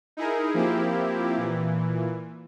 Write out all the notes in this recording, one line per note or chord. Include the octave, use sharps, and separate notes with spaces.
D#4 E4 G#4 A#4
F3 A#3 C4 E4 G4
A#2 E3